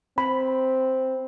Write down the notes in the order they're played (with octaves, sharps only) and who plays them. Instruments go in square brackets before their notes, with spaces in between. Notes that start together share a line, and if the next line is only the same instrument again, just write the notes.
[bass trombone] C4 [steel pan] B5